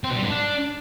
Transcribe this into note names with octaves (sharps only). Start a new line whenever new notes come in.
C4
B2
G3
G#2
D4